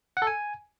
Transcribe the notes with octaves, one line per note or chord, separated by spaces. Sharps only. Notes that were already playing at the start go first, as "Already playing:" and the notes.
F#5
A4
G#5